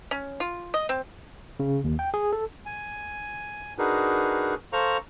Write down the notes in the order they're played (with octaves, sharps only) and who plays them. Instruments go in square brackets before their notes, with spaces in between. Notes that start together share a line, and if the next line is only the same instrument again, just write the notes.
[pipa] C#4
F4
D#5
C4
[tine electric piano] C#3
D#2
G5
G#4
A4
[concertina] G#5
D4 D#4 F#4 G#4 A#4 B4
A4 C5 F5 A#5 C#6